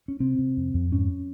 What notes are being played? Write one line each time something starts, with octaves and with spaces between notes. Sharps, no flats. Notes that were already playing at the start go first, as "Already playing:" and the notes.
C#4
C3 C4
C3
F2
F2
G#2 C#4